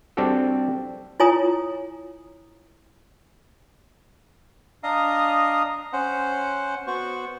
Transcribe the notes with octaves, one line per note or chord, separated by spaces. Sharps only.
G3 C4 D4 F#4 G4 A4
E4 F4 C#5 G#5 A#5 D#6
D4 D#5 F5 A#5 D#6
C#4 C5 F#5
B3 F#4 C5 C#6